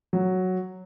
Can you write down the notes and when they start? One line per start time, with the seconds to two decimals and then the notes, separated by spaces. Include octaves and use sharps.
0.13 F#3